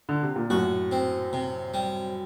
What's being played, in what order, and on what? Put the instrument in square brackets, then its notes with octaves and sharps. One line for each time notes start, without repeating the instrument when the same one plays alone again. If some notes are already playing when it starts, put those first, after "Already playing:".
[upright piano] D3
C3
A#2
[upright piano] F#2 A2 [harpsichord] F#4
[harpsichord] C4
C3
G3